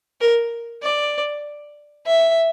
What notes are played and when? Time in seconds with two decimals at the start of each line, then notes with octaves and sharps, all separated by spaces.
0.21 A#4
0.83 D5
2.07 E5